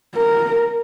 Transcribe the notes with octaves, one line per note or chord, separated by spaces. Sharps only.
A#4